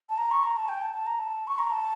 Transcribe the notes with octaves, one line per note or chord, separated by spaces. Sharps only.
A5
A#5
C#6
A#5
A5
G5
A5
A5
A#5
A5
C#6
A#5
A5